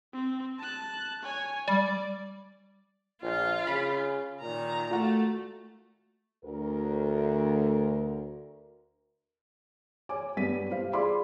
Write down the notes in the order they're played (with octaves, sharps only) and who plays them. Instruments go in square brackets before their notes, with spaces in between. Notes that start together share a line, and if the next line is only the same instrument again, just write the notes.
[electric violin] C4
A5 F#6
C#5 G#5
[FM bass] G3 [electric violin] D5
[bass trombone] A#1 [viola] F4
[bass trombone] C#3 [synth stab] B5
[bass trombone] A#2 [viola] D#3 A#5
[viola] A3 [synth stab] F4 F#4
[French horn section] D2 A#4
[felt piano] C#5 G#5 D6
G2 B3 B6 D#7
G3 C5 F5
F4 G#4 D5 B5 C6 D6